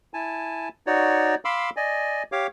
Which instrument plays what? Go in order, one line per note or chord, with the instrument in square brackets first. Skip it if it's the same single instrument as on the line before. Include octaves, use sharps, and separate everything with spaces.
[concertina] E4 G#5 A5
D#4 F#4 C#5 D5
F5 B5 C6 D6 E6
D5 D#5 G#5
G4 C#5 F5 D6